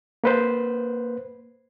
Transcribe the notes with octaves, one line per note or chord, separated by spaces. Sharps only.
A#3 B4 C5